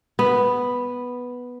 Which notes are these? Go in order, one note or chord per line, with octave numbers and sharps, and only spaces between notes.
B3